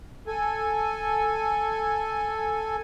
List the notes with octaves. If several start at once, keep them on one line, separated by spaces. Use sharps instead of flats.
A4 G#5